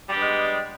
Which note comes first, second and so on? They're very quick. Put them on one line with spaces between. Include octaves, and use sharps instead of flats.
G3 G4 D4 B3 G#3